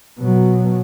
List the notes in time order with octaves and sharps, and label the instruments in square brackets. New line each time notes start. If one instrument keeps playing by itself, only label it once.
[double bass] B2 F#3